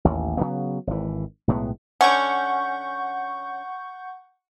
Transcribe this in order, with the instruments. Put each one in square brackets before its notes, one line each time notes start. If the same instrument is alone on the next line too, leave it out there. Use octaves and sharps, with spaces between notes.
[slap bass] A1 D#2
C#3 F#3 B3
G#1 E3
B1 A2 G#3 B3
[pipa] D3 C#4 [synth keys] F#5 C#6 G6